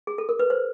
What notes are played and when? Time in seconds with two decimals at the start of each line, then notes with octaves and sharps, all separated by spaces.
0.07 G#4
0.18 A4
0.29 A#4
0.39 B4
0.50 C5